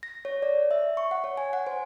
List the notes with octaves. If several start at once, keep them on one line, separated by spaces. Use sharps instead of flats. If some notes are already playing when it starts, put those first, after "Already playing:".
A#6
C#5
D5
E5
C#6
F#5
C#5
G#5
F#5
C5